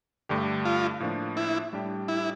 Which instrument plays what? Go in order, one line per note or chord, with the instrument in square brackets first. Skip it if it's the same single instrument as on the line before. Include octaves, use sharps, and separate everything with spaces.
[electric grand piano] G2 D3 A3 D4 G4
[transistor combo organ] F4
[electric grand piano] A2 F3 A#3 D4
[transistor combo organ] E4
[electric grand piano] A2 G3 D4 G4
[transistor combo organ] E4